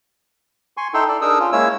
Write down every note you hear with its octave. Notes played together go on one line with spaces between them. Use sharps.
G#5 C6 C#6
D#4 E4 A4 G5 C6
A4 D5
D4 D#4 G#4 A#4 D#6 E6
C#4 F4
G#3 A#3 C#4 E4 C#5 E6